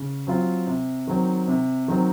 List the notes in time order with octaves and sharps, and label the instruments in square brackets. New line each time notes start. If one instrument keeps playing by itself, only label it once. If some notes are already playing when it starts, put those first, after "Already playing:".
Already playing: [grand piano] C#3
F#3 C4 F4
C3
D#3 F#3 C4
C3
D#3 F#3 C4